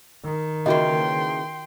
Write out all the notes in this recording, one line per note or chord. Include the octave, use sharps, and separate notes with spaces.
D#3
C#3 E3 A#3 F4 F#4 D#5 G5 C6